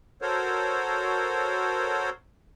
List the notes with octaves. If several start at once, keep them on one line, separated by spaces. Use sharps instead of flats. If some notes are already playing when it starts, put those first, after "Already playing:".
F#4 A4 A#4 C5 C#5